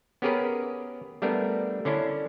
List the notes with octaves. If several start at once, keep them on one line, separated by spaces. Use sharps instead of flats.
B3 C#4 G4 G#4 A#4 B4
G3 A3 B3 D4 A#4
D3 C#4 D4 E4